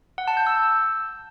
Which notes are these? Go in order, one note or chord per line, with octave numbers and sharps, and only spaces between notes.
F#5
A5
G6
E6